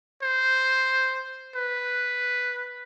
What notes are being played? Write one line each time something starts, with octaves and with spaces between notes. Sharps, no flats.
C5
B4